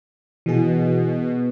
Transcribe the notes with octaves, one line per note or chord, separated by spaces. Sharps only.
B2 E3 G#4